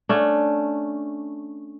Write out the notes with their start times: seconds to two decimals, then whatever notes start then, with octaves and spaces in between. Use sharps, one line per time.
0.09 A3 C#4 D4